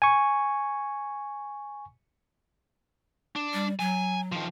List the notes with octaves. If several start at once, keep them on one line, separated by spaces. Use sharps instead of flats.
G#5 C#6
D4
G3
F#3 G#5
D#3 F3